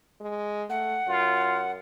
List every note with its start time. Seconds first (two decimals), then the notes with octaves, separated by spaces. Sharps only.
0.21 G#3
0.70 A3 F#5
1.07 F#2 F4